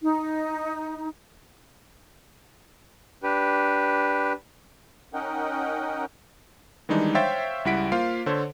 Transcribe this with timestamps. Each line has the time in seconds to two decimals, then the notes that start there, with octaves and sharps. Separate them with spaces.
0.02 D#4
3.23 D4 G4 B4
5.14 C#4 D#4 A#4 D#5 F#5 G5
6.89 D#3 E3 G3 G#3 D4 D#4
7.15 C5 C#5 E5 F5 G5 A6
7.65 C#2 G3 E4 F#5 B6 D7
7.92 A#3 F4 C5 F5
8.26 D3 A4 C5 C#5